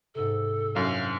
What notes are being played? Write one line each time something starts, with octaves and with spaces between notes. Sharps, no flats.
G#2 C3 A4
F#2 C4 D4 E4 F5